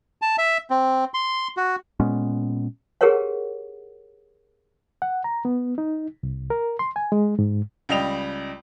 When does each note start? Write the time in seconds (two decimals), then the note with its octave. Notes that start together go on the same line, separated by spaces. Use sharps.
0.22 A5
0.38 E5
0.70 C4
1.14 C6
1.57 F#4
2.00 A#2 G#3 B3 C#4
3.01 G4 G#4 A#4 B4 C#5 F#5
5.02 F#5
5.24 A#5
5.45 B3
5.78 D#4
6.23 C2
6.50 A#4
6.79 C6
6.96 G#5
7.12 G#3
7.39 G#2
7.89 C#2 G3 D#5 G5 F7